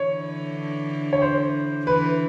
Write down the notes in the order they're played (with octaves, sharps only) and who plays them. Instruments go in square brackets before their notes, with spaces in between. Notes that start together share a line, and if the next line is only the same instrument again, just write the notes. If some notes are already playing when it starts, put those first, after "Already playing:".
Already playing: [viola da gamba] D3 E3 [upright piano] C#5
[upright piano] C#5
C5
[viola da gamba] D3 E3 [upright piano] B4